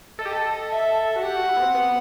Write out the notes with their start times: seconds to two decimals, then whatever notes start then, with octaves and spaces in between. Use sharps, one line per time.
0.19 A4 D#5
0.25 G4
0.33 A4
0.71 E5
1.16 F#4
1.22 G4 F#5
1.36 F#4
1.49 E4
1.57 B3
1.62 C4
1.75 B3